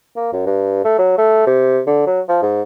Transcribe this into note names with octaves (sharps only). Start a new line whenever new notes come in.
A#3
F#2
G2
A3
F#3
A3
C3
D3
F#3
F3
G#2